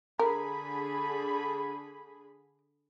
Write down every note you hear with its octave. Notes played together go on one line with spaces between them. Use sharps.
D3 G#4 A#4 B5